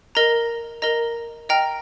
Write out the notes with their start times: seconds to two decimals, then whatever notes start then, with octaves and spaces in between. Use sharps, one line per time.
0.15 A#4 D#5 A#5
0.82 A#4 D#5 A#5
1.49 D#5 G5 A#5 F6